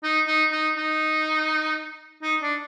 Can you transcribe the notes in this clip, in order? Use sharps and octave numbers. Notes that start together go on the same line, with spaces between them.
D#4
D#4
D#4
D#4
D#4
D4